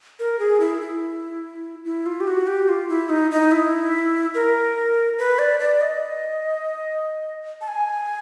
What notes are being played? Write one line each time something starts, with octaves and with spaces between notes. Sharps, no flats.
A#4
G#4
E4
E4
E4
F4
G4
F#4
G4
F4
E4
D#4
D#4
E4
A#4
B4
D5
D5
D#5
A5
G#5